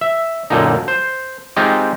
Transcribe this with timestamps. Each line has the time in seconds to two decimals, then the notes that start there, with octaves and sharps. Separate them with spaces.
0.01 E5
0.50 F#2 A#2 D3 D#4
0.88 C5
1.57 G#3 C4 D#4 F4 G4